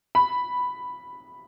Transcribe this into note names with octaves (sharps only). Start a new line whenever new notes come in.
B5